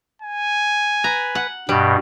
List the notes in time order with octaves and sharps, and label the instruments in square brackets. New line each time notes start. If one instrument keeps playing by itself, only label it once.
[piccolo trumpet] G#5
[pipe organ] B4 [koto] A#5
[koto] F#5
[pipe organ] G2 B2 [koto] G3